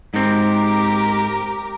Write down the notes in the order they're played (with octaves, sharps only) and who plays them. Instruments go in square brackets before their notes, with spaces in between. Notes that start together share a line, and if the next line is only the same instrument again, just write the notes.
[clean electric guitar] G#2 C4 [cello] G4 A#4